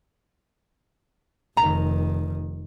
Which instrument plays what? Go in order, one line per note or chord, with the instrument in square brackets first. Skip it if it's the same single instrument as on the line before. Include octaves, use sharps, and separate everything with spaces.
[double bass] F1 D#3 [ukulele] A#5